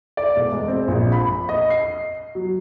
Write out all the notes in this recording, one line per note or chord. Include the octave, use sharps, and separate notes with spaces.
D5
E1
G#3
C4
A#1
B5
D#5
C7
F#3